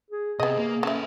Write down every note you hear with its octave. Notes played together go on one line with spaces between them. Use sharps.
G#4
C3 B3 G#4 D#5
A#3
C#3 A4 B4 E5